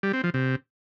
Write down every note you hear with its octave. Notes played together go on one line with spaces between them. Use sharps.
G3
C4
F3
C3